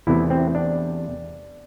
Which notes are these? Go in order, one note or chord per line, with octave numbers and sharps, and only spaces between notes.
E2 C3 E3 A3 E4
C4
D4